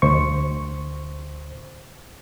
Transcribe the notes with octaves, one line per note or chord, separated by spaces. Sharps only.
D2 C5 C#6